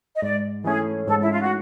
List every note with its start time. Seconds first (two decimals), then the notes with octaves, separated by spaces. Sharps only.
0.16 D#5
0.22 G#2 D5
0.64 E3 A3 C#4 G#4
1.07 G#2 A4
1.22 E4
1.31 F4
1.41 F#4